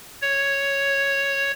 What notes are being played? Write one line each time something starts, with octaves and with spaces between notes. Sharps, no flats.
C#5